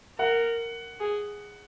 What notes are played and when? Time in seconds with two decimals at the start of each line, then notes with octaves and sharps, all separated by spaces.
0.19 A#4 F#5
1.00 G#4